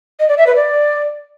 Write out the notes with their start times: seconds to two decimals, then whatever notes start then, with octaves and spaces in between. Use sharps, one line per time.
0.20 D#5
0.29 D5
0.38 E5
0.47 B4
0.56 D5